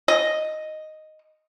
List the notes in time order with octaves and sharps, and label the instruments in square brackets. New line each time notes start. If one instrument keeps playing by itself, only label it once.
[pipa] D#5